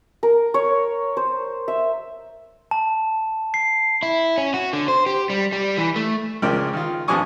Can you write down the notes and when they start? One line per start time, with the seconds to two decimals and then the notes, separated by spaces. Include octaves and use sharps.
0.23 A#4
0.54 C#5
1.17 C5
1.68 E5
2.71 A5
3.54 C7
4.03 E4
4.38 C#4
4.54 F#4
4.73 D3
4.88 C5
5.06 G4
5.30 G3
5.52 G3
5.78 E3
5.96 A3
6.42 C#2 C#3 F3 A#4 D5 G5
6.73 D#3 F4
7.08 A1 F2 D4 G#5 C#6 D#6